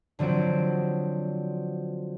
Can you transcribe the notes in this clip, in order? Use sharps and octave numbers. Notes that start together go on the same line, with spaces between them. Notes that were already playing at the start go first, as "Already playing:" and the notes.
D3 F3 F#3 C4 D7